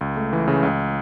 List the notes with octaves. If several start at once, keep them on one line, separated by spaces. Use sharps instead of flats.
C#2
A3
E3
C#3
C#2